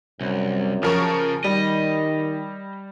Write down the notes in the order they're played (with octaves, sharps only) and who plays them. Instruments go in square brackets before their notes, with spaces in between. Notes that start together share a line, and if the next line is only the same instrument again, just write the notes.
[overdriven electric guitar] C2 [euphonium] F#2
[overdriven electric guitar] C#3 [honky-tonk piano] F3 A#4 C#6
[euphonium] D#3 [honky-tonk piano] G3 [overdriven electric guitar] D#5